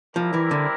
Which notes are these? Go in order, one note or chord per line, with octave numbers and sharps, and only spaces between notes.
F3 G3 C4 E4 A#4 D5
E3
D3